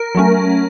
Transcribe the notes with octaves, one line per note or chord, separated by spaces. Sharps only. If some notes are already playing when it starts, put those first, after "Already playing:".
Already playing: A#4
F#3 A3 C#4